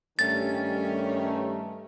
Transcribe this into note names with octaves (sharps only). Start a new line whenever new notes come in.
G2 D#3 G3 A3 C#4 A6